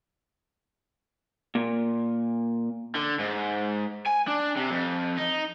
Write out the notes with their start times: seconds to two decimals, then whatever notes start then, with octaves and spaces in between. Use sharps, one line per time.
1.55 A#2
2.95 D3
3.19 G#2
4.07 G#5
4.28 D4
4.57 C3
4.71 F2
5.17 D#4